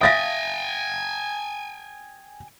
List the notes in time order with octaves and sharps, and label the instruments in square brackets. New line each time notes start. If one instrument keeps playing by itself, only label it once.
[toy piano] E5 F5 [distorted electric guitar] G5 G#5 [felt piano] D#6 A6 A#6